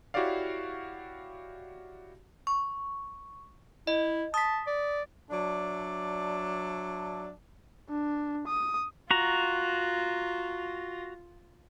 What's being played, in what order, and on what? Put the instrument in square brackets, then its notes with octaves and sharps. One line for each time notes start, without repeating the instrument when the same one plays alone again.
[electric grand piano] E4 F#4 G4 C#5 D5 F5
[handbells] C#6
[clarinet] E4 [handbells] D#5
[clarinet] A5 [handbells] D#6 B6
[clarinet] D5
[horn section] F#3 D4 D5 E5 A5
[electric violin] D4
D#6
[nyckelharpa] F4 [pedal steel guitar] F#4 A#5